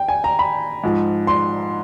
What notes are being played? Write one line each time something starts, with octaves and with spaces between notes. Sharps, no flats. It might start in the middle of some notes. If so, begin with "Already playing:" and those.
Already playing: G5
G#5
A#5
B5
G#2 F3
C6